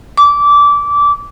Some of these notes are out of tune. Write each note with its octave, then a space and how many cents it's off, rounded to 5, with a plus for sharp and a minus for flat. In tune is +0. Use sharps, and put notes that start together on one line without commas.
D6 -20